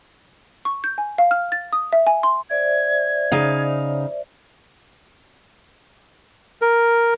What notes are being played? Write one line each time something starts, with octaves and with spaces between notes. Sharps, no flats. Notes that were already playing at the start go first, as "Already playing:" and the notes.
C#6
G6
G#5
F5
F6
A6
D#6
E5
G#5
C6
C5 D5 E5 G#6
C#3 D#4 F5
A#4